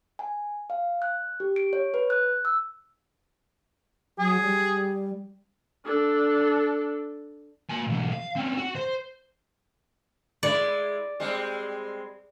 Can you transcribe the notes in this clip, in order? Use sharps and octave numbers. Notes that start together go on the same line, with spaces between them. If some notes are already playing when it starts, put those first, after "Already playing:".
G#5
F5
F#6
G4
D7
C#5
B4
F#6
E6
F#3 G#4
G3
D4 A4
A#3 G#5
B1 E3
F5
C4 C#4
F#4
C5
G#3 E4 D5
G3 G#3 C4